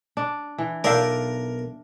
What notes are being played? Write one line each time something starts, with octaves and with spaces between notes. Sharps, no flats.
D4
E3
B1 D4 F4 A#4 D5 E5 F5 G5